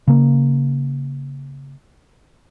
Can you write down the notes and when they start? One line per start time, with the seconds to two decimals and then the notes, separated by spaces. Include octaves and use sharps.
0.08 C#3 A#3